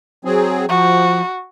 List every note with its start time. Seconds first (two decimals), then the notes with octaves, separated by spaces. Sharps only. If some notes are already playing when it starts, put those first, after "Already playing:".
0.25 F#3 C4 G#4
0.69 F3 F#4